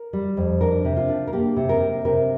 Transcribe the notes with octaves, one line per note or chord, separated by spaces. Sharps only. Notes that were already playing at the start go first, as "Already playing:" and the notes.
Already playing: A#4
G3
F2
D4 A#4
C3
F4
D4
A#4
A#3 G4
C3
A#4
C3
C3 A#4